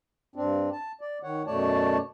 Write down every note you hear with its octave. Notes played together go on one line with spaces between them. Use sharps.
G2 C4 D4
A5
D5
D#3 C#5 F#5
F#2 B2 A3 C#5 D5 A5